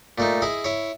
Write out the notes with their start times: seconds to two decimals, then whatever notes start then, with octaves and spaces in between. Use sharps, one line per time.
0.18 A#2 A3 D#4
0.42 E4 G#4 D#5
0.64 E4 C#5